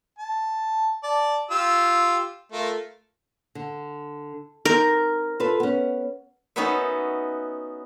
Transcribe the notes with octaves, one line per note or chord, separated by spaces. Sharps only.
A5
D5 A5
F4 G4 E6
A3 F4 A#4
D3
C4 D#4 A#4
F4 A4 B4
B3 C#4
B3 C#4 D#4 F#4 B4 E5